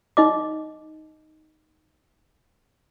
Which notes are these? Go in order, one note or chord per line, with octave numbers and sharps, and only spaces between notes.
D#4 D#5 D6